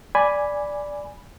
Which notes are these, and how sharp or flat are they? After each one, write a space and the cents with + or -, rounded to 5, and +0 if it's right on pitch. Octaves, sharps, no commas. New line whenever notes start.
D5 +0 G#5 +0 B5 +0